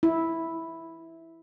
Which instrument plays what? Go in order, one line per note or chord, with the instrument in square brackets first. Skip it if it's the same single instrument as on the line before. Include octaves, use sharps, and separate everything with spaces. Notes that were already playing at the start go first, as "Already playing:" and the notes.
[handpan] E4